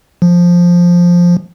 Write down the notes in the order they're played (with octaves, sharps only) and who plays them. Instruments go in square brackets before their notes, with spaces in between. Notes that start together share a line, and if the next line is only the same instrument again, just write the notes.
[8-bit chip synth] F3